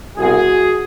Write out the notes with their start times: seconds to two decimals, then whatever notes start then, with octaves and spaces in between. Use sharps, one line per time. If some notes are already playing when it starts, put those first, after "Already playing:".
0.17 C2 B2 F#4 G#4